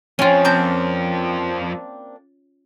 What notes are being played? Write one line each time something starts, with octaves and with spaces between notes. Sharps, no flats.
F2 F3 C#4 F4 C#5 G5 D#7
A#3 C4 D4 G5 G6